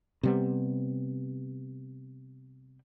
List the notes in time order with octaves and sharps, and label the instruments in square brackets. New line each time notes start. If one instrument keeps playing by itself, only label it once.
[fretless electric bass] C3 G3 B3